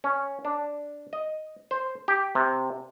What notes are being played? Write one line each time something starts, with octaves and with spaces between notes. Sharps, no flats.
C#4
D4
D#5
C5
G4
C3